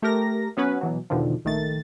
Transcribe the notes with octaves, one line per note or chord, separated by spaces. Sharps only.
A3 G4 A#4 A#6
F#3 B3 C#4 B4
B2 E3 F#3
E2 B2 D3 D#3 F3
A#1 D#3 A3 A6